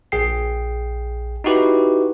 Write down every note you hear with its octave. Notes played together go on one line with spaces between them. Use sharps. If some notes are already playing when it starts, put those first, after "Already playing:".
A#1 G#4 G5 C7
D#4 E4 F#4 G4 B4